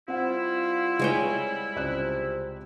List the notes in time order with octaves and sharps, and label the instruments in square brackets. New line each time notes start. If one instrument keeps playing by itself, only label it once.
[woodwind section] G3 E4 [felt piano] C4 F#5 [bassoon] F4
[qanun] G#3 C#5 G5
[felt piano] C#2 D5 F#6 [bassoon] C3